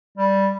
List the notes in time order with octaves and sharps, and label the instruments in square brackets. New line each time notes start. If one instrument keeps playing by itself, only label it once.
[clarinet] G3